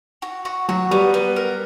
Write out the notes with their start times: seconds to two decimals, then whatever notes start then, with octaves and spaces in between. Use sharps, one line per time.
0.22 F#4
0.45 F#4
0.68 F#3 F#4
0.91 G3 B3
1.14 B3
1.36 A#4